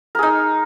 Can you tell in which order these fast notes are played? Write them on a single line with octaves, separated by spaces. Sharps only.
A#4 G#4 D#4